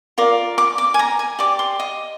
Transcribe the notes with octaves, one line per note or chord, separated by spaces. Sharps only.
F4 A#4 D5
D6
D6
G#5
A#5
G#5
G4 D5 D6
C6
D#5